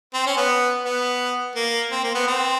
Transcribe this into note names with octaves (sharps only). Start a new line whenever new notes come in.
C4
C#4
B3
B3
A#3
C4
A#3
B3
C4